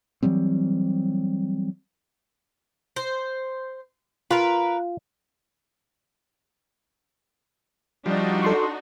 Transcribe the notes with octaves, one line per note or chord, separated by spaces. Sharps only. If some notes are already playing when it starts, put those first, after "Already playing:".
E3 F#3 G3 C4
C5
F4 A#4 B4
F3 G3 D4 D#4 F#4
A4 C6 C#6